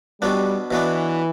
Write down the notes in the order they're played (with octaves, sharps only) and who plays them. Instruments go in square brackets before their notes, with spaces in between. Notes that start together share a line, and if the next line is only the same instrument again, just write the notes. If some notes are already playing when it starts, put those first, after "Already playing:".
[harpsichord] B2 F#3 B3 D4 [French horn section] G3
[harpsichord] B2 F#3 B3 D4 [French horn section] E3